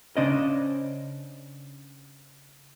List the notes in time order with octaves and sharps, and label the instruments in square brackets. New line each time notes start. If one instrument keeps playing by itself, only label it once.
[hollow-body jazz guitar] C#3 C#4 D4 C5 D5 D#5